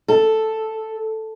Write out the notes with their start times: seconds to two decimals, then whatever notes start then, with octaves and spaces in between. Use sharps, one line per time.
0.08 A4